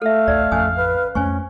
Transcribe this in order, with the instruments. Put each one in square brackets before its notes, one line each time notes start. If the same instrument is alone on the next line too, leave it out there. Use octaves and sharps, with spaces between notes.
[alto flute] A3 [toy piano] A4 E5 [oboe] F5
[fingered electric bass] A1 D2 [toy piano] D5
[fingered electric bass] A1 F2 F3 [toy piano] C#4 G#5 D#6
[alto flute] B4
[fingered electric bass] F2 A3 [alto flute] C#4 [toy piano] C5 G#5 C#6